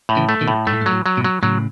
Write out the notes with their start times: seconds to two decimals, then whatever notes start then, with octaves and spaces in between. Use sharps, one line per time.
0.09 A2
0.16 C#3 E3
0.29 A3
0.41 B2 D#3
0.48 A2
0.67 G#2 A3
0.73 A2
0.81 G#2
0.86 F#3
0.92 A2
1.06 F#3
1.17 G#2 B2
1.24 F#3
1.43 A2 C#3 F#3